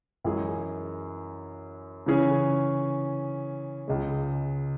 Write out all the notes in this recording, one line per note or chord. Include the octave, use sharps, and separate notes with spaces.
F#2 E3 G#3 E4 G#4
C#3 E3 C#4 G#4
C#2 C#3 G#3